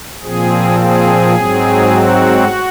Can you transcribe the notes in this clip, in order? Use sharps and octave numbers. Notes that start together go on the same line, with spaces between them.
A#2 F3 C4 G#4
G#4
G#2 F#3 C4
F#4